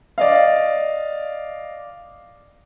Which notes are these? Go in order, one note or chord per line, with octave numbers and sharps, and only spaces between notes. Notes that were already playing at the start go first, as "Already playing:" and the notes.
D5 D#5 F5